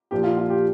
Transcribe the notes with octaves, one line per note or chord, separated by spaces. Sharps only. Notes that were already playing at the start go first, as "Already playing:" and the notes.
A#2 F3 G4
F4
F4
G4